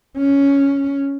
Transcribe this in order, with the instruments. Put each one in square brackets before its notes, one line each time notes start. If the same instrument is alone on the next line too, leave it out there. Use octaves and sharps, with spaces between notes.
[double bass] C#4